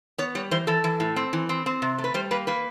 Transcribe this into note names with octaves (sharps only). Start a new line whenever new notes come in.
B3 C#5
G3 C#5
E3 C5
E3 A4
E3
A2
C4
E3
C4
C4
C3
A3
B4
G3 C5
A#3 B4
A#3 B4